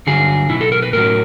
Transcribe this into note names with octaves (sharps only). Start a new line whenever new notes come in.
G2 D3 F#3 G#4
B2 F#3 E4
A4
A#4
B4
A2 F#3 A#4